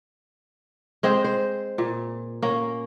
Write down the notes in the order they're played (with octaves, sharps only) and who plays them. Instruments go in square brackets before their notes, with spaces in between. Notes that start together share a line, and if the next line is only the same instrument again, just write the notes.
[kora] G#3 C4 G#4 C5
C5
A#2
A#3 C#4